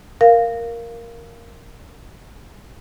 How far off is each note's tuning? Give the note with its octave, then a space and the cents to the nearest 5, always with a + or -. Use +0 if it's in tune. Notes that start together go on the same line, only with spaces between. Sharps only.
A#4 +0 F5 -5